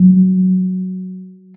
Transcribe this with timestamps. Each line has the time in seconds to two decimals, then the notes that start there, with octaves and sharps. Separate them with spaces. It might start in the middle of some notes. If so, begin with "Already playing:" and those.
Already playing: F#3